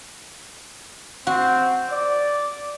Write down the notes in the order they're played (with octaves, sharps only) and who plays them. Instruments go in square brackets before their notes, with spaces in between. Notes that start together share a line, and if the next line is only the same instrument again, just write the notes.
[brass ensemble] C4 [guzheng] F#4
[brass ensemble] D5